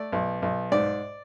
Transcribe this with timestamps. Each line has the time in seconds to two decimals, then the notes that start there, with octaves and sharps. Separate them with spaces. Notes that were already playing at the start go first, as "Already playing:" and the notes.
Already playing: A3 D5
0.12 B1
0.42 B1
0.72 G#2 D5